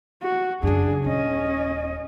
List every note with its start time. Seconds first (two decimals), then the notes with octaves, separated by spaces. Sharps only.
0.22 F#4
0.63 F#2 C#3 D4 G#4
1.04 D#1 C#4 D#5